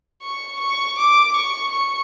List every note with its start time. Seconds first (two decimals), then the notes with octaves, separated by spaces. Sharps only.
0.22 C#6
0.60 C#6
0.98 D6
1.34 C#6
1.72 C#6